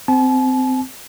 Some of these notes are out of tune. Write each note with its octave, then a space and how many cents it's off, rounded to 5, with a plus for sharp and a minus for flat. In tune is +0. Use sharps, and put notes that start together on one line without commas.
C4 -20 A5 -45